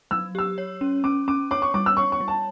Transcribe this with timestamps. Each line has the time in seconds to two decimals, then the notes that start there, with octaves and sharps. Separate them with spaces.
0.11 F#3 E6
0.35 G4 E6
0.58 C#5
0.81 C#4
1.04 C#4 D6
1.28 C#4 D6
1.51 C#5 D6
1.62 C#6
1.74 G3 D6
1.86 E6
1.97 C#5 C#6
2.12 C#6
2.20 G3
2.28 A5